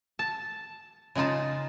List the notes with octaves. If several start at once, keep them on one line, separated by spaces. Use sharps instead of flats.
A5
C#3 G#3 D#4 F4 A5